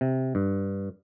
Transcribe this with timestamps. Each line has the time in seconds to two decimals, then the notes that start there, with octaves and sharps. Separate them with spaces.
0.01 C3
0.35 G2